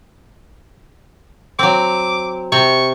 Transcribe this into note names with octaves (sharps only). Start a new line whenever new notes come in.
F#3 C4 D6
C3 C#6